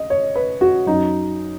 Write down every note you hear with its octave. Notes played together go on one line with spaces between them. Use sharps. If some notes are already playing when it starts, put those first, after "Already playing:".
Already playing: D#5
C#5
B4
F#4
F#2 F#3 D#4